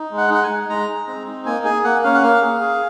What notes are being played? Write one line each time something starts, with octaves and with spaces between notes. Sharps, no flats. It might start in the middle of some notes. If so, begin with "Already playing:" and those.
Already playing: D#4
G#3
F#5
D#4 F#5
G#5
G#3
G#3 A#5
D#4
C4
D#4
A#3 G#5
G#4 G#5
A#3 F#5
C#4 F5
F#5
A#3 F5
G#4
G#4